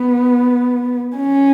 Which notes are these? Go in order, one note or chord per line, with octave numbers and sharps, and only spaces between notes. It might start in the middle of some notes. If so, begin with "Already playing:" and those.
Already playing: B3
C#4